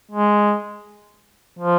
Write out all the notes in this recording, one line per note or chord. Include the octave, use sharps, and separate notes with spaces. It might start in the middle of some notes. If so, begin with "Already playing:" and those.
G#3
F3